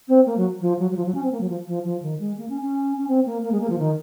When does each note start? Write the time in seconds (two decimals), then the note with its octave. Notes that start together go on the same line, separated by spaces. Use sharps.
0.08 C4
0.26 A#3
0.37 F#3
0.61 F3
0.79 F#3
0.91 F#3
0.96 F3
1.06 F#3
1.14 C#4
1.23 C4
1.32 A#3
1.41 F#3
1.49 F3
1.67 F3
1.84 F3
2.02 D#3
2.20 G#3
2.37 A#3
2.49 C#4
2.61 C#4
2.97 C#4
3.08 C4
3.26 A#3
3.43 A#3
3.52 G#3
3.61 A#3
3.70 F3
3.78 D#3